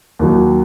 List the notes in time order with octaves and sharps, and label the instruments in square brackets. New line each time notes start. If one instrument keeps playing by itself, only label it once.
[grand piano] D#2 D#3 F#3